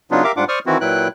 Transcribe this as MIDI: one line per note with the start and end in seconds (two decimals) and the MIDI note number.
0.11 0.24 49
0.11 0.24 54
0.11 0.24 59
0.11 0.24 62
0.11 0.24 63
0.11 0.24 65
0.24 0.32 67
0.24 0.32 70
0.24 0.32 76
0.24 0.32 77
0.24 0.32 86
0.36 0.45 44
0.36 0.45 55
0.36 0.45 62
0.36 0.45 65
0.36 0.45 78
0.36 0.45 86
0.48 0.59 72
0.48 0.59 74
0.48 0.59 85
0.48 0.59 87
0.48 0.59 89
0.66 0.78 51
0.66 0.78 52
0.66 0.78 60
0.66 0.78 64
0.66 0.78 66
0.81 1.08 46
0.81 1.08 54
0.81 1.08 64
0.81 1.08 71
0.81 1.08 79
0.81 1.08 90